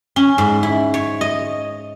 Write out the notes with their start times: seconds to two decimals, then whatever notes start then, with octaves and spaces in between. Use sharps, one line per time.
0.16 C#4
0.38 G#2
0.63 E4
0.94 C#5
1.21 D#5